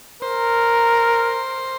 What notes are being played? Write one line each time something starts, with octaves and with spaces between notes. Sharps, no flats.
A#4 C5